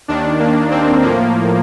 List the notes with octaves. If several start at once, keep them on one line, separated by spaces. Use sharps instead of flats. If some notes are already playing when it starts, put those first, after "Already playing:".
D#2 D#3 D4
A#3
C4
A2 F3 A#3